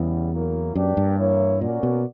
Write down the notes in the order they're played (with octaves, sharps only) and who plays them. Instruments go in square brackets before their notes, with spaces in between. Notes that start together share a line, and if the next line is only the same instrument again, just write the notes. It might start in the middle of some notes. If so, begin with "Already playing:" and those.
Already playing: [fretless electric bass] E2 [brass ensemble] C#3 G3 B3 E4
[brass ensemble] F#3 A#3 E4 A#4
[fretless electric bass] F#2 [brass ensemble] A#3 D4 G4 B4 D5
[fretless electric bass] G2
[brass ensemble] E3 A#3 E4 A#4 C#5
[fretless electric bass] A#2 [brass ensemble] A#3 C#4 F#4 A#4 D5
[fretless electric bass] B2